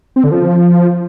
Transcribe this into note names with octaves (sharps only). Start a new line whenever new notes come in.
C4
D3
F3